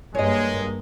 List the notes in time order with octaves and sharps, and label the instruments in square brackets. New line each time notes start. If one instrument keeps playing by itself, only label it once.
[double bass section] G2 A#3 [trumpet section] G#3 [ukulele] C#5 D#5